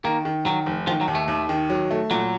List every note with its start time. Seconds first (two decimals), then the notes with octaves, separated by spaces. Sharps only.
0.04 D#3 A#3
0.25 D#3
0.46 D#3 F#3
0.66 F1
0.87 D#3 F3
1.01 F#3
1.08 D#2
1.15 A3
1.28 D#2
1.49 D#3
1.70 F#3
1.91 A3
2.11 A#2 F#3